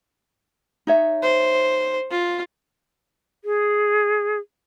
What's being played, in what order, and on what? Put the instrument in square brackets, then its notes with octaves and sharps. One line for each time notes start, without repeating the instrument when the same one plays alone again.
[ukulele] D#4 C#5 E5
[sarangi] C5
F4
[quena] G#4